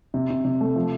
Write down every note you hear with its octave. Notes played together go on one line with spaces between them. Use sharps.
C3
C3
C3
A3
F3